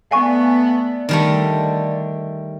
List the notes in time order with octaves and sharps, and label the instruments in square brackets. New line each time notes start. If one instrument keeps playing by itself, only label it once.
[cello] A3 B3 [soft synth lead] D5 [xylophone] F5 G#5 C#6
[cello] D3 [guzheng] D#3 G3 A3